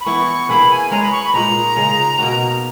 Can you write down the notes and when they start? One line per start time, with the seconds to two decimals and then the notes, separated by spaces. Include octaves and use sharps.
0.01 B5
0.06 E3 B3 E4 C#6
0.49 A#3 E4 G#4 B4 B5
0.71 G#5
0.91 G#3 C#4 G#4 B4 A#5
1.03 B5
1.12 C#6
1.24 B5
1.33 A#2 G#3 D#4 A#5
1.76 C#3 G#3 D#4
2.19 B2 A#3 D#4 F#4